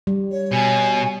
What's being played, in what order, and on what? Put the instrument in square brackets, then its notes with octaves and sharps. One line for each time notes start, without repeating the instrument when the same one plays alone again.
[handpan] G3
[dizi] C#5
[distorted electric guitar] B2 [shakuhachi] G#5